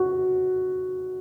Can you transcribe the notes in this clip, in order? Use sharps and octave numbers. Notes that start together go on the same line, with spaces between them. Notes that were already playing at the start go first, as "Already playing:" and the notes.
Already playing: F#4